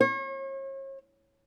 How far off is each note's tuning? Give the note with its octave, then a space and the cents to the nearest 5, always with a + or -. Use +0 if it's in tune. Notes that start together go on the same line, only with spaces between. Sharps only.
C#5 -40